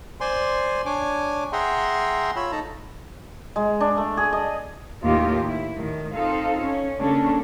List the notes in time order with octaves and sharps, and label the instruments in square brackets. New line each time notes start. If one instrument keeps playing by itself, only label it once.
[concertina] C5 D5 G#5 C6
D4 C#5 G#5 D6
G#4 E5 F#5 G5 A#5 C6
F4 C#5 B5 E6
D#4 A4 A5 A#5
[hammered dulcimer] G#3
D4
A3
G#4
D#5
[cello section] D#2 A2 A#3 F4 G4
E4
A2 D#3
C4 D#4 F4 A4 F5
C#4
C#3 G3 A#3 C#4 D4 A4